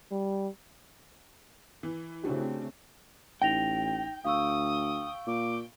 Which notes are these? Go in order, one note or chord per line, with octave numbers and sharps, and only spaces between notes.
G3
E3
C#3 A3 C4 D4 F#4 G4
A1 D#4 G5 A#6 F7
D2 F5 C#6 D#6 E6
A#2 D6